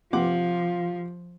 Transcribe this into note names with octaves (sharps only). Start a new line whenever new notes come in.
C3 F3 F4 F#5 D6